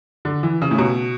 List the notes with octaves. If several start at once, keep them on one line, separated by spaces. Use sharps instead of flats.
D3
E3
C#3
A2
B2